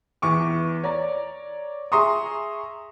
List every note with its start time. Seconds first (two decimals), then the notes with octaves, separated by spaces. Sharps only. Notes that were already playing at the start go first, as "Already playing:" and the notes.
0.22 E2 E3 C#6 D6
0.84 C#5 D5 A#5
1.92 G#4 E5 A#5 C6 C#6 D#6